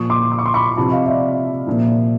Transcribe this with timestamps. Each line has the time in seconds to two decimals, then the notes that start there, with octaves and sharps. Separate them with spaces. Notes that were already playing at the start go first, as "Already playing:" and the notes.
Already playing: A#2 F3 C#6 D#6
0.10 C6 D6
0.32 D6
0.39 C#6
0.46 C6 D6
0.54 B5 C#6
0.77 C3 F3 A5 B5
0.91 D#5 F5
1.06 D5 E5
1.67 A#2 F3